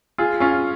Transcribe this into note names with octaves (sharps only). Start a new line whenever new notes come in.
F4 G#4
C#4 F4